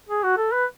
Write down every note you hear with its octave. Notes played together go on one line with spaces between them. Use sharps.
G#4
F#4
A4
B4